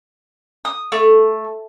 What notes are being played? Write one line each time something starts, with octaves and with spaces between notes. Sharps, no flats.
D#6
A3